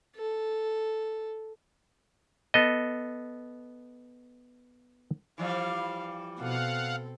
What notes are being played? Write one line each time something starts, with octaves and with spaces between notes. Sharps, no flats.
A4
B3 A4 D#5
E3 F3 G3 F5
B2 C4 A4 F5 F#5